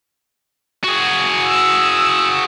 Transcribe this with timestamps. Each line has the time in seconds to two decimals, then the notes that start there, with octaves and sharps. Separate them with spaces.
0.84 F#4 G#4
1.47 E6